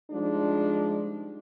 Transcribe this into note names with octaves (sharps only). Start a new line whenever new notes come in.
F3 G3 G#3 D4 D#4